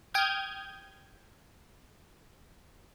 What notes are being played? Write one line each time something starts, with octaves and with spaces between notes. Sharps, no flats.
G5 D#6 F6 G6 G#6